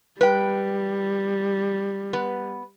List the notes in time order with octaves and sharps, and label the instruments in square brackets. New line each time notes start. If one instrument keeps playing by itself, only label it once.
[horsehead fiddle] G3 [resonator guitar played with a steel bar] B4 G5
[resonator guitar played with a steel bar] B3 B4